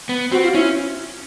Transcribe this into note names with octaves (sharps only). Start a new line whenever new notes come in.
B3
C4 F#4
F4
C#4 E4